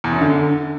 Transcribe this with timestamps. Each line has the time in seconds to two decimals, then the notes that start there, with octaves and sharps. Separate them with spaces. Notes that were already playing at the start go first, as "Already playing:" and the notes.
0.04 E2
0.13 F#2
0.21 D3